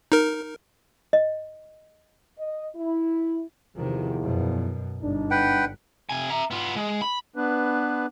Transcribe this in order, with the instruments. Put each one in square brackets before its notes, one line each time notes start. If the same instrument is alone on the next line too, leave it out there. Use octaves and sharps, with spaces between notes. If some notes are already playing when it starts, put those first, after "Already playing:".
[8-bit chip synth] D#4 A#4
[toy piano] D#5
[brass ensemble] D#5
E4
[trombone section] E2 F3 [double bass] C3 D#3
[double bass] F#2 B2
[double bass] G1 [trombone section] D4 D#4
[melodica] B4 F#5 G5
[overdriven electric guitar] C3 G#5
E5 A#5
B3 F4
G#3
B5
[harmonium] B3 D4 B4